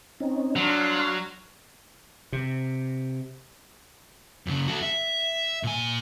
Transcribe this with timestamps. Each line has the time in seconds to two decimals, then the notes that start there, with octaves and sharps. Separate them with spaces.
0.20 C4 C#4 D#4
0.56 F#3 D4 F5 C6
2.32 C3
4.47 F#2 C#3
4.68 F#4 A4
4.82 E5
5.63 A#2 G#5